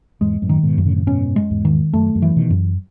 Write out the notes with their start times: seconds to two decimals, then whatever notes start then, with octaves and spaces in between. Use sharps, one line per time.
0.21 E2 G#2 G#3
0.42 F#2 A2
0.49 D#3
0.63 G#2 B2
0.78 F#2
0.85 A2 C#3
0.97 C#3
1.07 G#2 B2 C#4
1.36 G#3
1.51 E2 G#2
1.65 D#3
1.93 F#2 A3
2.15 F#2
2.22 E3
2.36 B2 D#3
2.50 F#2